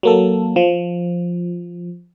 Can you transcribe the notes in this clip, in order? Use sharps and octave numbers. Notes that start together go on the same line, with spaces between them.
F#3 A#3 A4
F3